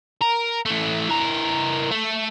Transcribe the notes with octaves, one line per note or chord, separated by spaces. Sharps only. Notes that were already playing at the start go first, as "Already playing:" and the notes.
A#4
E3 A3
E3 A#4
A3